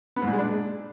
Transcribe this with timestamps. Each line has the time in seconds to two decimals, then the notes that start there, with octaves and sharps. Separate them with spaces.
0.16 B3
0.22 G#2
0.27 A#2
0.33 G#3
0.39 D4